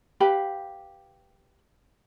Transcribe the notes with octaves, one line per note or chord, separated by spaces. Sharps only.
G4 B4 F5 B5